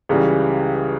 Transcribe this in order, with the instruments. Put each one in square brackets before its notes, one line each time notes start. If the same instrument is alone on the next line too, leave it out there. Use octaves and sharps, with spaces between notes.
[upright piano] C#2 C#3 E3 G3